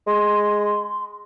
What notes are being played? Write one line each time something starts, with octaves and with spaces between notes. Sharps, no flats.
G#3 C6